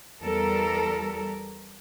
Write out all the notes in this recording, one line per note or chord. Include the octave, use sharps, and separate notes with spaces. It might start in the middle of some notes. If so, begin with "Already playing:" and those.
E2 G3 A4 A#4